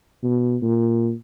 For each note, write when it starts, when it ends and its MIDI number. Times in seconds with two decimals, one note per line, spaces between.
0.23 0.57 47
0.62 1.12 46